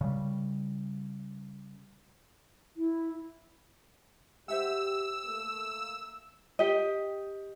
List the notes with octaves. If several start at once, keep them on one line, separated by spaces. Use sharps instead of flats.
C#3 G3
E4
G4 C5 E5 F#5 E6
A3 A#3
G4 D#5